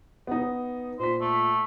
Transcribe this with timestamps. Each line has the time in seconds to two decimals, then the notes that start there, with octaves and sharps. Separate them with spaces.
0.27 B3 D#4
0.99 A#2 C5 B6
1.21 A3